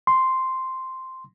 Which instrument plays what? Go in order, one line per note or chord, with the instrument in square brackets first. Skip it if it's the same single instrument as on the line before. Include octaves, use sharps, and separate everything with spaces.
[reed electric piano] C6